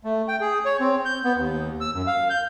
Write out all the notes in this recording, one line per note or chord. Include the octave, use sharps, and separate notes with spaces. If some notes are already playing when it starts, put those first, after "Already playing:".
A3
G5
G#4
C#5
C4
G6
B3
D#2
E6
F#2
F5
G6